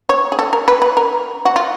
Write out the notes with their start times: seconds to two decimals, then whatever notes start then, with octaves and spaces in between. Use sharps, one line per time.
0.09 C#5
0.32 G#4
0.39 A4
0.53 A#4
0.68 B4
0.82 B4
0.97 A#4
1.45 F#4
1.56 F4